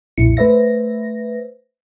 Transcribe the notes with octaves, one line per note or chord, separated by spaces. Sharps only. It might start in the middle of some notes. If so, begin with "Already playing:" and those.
B1 F2 A#2 E4 C#7
A3 B4 C5 E5 A#6